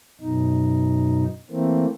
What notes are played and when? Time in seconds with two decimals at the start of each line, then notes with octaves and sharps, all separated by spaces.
0.21 F#2 B2 D#4
1.50 E3 A3 A#3 C4